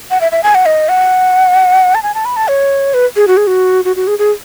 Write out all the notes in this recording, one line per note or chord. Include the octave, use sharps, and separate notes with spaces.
F#5
E5
E5
G#5
F#5
D#5
F#5
A5
G#5
A5
B5
A5
C#5
B4
G#4
F#4
G#4
F#4
F#4
F#4
G#4
G#4